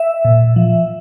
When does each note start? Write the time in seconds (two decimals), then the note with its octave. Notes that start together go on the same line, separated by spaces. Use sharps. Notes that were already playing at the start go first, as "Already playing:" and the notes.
Already playing: E5
0.25 A#2
0.56 F3